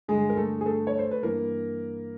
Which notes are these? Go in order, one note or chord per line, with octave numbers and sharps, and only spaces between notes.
G2 D3 G#3 G#4
A#4
A3 A4
G#4
A3 A4
C#5
C5
B4
G2 E3 A#3 A#4